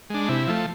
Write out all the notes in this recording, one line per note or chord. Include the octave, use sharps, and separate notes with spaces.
G#3 D4
C3 E4
F3 A3